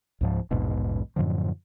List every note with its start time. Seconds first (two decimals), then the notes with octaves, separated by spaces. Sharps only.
0.21 C#2 G#2 F3
0.51 A#1 E2 G#2 B2
1.16 F#2 A2 D3 F3